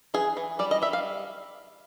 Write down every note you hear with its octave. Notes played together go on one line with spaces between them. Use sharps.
E3 G#4
E3
G3 D5
D#5
G3 E5
F5